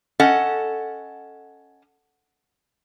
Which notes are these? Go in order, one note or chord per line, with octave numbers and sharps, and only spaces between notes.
C#4 A4 D#5 F#5